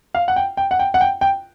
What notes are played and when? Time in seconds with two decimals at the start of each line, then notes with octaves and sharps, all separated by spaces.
0.15 F5
0.28 F#5
0.36 G5
0.57 G5
0.71 F#5
0.79 G5
0.94 F#5
1.01 G5
1.21 G5